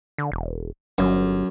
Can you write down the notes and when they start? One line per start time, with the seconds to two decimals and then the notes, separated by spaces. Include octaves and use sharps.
0.18 D3
0.32 E1
0.98 G1 F#2